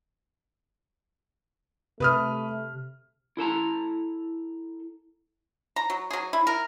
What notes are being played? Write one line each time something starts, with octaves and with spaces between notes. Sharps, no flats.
C3 A3 B4 D#6 F6
E4 A4 A5 A#5
A#5
F#3
F#3 G#4
E4
A#4